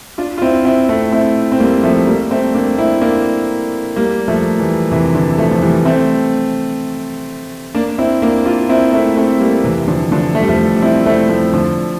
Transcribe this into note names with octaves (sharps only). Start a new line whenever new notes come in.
D4 F4
F4
C4 E4
C4 E4
A3 C4
C4 E4
C4
G3 A#3
F3 A3
G3 A#3
A3 C4
A#3 D4
C4 E4
A#3 D4
G3 A#3
F3 A3
E3 G3
C3 E3
D3
F3 A3
F3
E3 G3
A3 C4
A#3 D4
C4 E4
A#3 D4
D4 F4
C4 E4
A3 C4
A3 C4
G3 A#3
C3 E3
D3 F3
D3 F3
A3
G3
F3 A3
D4
C4 E4
A3 C4
F3 A3
D3 F3